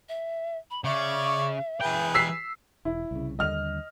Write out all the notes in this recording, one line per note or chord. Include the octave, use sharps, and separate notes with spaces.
E5
B5
C#3 C#5 D5 E5 C#6
E3 G#4 B4 G5
E6 B6 C7
E1 E4
C2 C#3
D#2 D3 G3 D#5 F6 F7